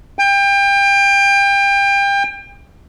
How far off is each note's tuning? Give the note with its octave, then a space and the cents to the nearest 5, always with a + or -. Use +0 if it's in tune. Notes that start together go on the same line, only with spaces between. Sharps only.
G5 +30